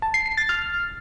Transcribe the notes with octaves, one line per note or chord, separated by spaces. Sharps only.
A5
C7
C7
A6
F6